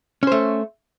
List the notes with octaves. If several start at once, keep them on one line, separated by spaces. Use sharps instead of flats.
A3 C#4 C5